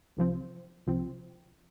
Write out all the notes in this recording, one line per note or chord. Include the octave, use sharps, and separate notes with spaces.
C2 C3 F3 C4
C2 C3 F3 C4